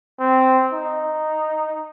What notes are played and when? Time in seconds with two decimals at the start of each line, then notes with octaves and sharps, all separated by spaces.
0.20 C4
0.73 D#4